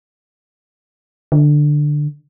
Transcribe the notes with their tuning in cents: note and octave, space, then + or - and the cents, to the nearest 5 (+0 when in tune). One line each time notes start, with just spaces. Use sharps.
D3 +10